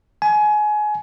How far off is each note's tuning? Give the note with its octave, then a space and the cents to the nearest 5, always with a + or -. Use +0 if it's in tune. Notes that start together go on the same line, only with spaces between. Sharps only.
G#5 +25